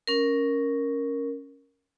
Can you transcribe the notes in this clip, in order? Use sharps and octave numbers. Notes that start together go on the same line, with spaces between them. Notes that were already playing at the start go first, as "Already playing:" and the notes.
C#4 A#4